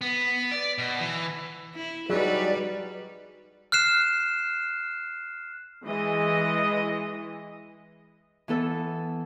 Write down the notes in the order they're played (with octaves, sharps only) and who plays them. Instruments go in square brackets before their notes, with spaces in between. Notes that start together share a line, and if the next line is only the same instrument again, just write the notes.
[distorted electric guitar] B3
D5
B2
E3
[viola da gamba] E4
[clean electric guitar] F#3 D#4 [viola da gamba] G3 B4 [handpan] F#4 G#4 [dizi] D5
[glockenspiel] F6 F#6 C7 E7
[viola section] E3 G#3 D#5
[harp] E3 B3 A4 E5